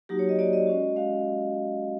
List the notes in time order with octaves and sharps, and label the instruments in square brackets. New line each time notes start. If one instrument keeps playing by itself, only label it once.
[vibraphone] F#3 A#3 D#4 F#4 G4
C#5
D#5
F#3 A#3 D#4 F#4 D5
D#5
G#3 C#4 F#4
G#3 C#4 F#4 F5